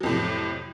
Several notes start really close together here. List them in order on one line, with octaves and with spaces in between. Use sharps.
F#3 F2 A2 C3